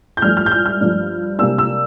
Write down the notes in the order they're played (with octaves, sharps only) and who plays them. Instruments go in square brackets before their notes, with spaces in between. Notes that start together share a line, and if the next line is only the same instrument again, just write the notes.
[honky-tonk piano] G6
G2 F3 A3 D4 F6
F6
G6
F6
F6
G2 F3 A3 D4
C3 G3 A#3 D4 E6
E6